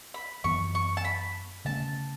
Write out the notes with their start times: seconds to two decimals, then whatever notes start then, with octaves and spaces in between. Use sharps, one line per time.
0.14 B5
0.44 F#2 E3 B3 C#6
0.75 C#6
0.97 A5
1.05 B5
1.65 C#3 A3 C#4 A5